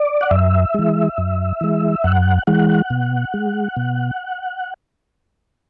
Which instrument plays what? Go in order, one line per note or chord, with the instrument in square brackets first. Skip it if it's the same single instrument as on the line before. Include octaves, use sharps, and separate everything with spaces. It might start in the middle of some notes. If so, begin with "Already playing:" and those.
Already playing: [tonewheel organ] D5
F#5
F#2 E5
E3 G#3
F#2
E3 G#3
F#2 F#5
E3 G#3 F#5
B2
G#3
B2